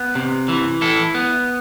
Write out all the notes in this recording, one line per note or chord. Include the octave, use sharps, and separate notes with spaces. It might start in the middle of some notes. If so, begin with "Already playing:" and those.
Already playing: B3
C3
E3
E4 A4
B3